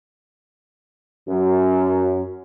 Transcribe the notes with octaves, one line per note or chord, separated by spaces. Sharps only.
F#2